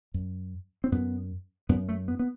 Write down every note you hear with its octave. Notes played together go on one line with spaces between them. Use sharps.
F#2
C4
F#2 B3
F#2 B3
A3
B3
B3